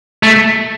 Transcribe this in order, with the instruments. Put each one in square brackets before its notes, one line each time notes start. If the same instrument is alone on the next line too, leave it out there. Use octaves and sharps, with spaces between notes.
[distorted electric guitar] A3